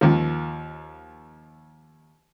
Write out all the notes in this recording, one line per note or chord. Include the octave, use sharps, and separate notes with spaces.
D#2 F3